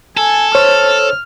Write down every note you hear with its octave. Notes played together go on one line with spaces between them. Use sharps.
A4 G#5
C5 C#5 F6